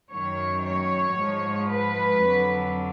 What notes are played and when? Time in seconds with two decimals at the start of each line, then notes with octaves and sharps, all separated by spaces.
0.11 F#2 D#3 F#3 C#5
0.65 C#5
1.17 G#2
1.22 F3
1.70 B4
2.22 F2 D3 F#3